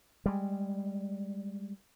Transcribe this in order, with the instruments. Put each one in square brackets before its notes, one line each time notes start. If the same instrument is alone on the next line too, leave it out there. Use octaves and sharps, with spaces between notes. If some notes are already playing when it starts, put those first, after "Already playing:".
[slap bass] G3 G#3